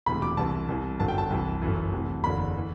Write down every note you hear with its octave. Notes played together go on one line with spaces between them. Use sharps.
E1 D2 C3 E3 B5
D6
C2 C3 E3 A5
C2 C3 E3
G1 F#2 D3 A5
G5
A5
C2 C3 E3
G1 F#2 E3
D2 C3 E3
F#1 E2 D3 B5
E3